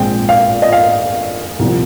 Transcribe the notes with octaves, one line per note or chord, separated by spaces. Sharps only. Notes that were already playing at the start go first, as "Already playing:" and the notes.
Already playing: A#1 A#2 G#3 C4 G5
F5
D#5
F5
C2 A#2 F3 C4